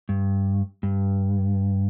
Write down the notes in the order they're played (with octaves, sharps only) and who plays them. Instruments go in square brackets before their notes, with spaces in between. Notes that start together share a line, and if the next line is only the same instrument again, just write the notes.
[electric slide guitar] G2
G2